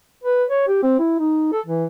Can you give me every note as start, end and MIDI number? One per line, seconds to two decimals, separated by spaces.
0.24 0.44 71
0.49 0.67 73
0.68 0.82 67
0.83 0.99 60
0.99 1.16 64
1.19 1.50 63
1.53 1.61 69
1.66 1.86 52